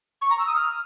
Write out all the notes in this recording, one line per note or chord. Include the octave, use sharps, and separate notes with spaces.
C#6
A#5
E6
D#6
F6